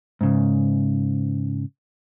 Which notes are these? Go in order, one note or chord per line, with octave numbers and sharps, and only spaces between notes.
G#2 C#3